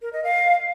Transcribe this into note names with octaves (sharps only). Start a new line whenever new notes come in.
A#4
D#5
F5